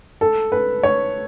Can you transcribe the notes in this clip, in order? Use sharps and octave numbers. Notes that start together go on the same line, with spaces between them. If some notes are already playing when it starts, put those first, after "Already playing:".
A4
B4
C#5